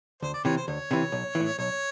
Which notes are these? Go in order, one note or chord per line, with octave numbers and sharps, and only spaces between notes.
D2 C5
D5
C3 E3 C#5
C5
D2 C#5
C3 E3
B1
A2 E3
B1 C#5